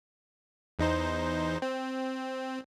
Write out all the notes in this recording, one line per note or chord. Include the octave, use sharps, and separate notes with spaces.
E2 D#4 C5
C4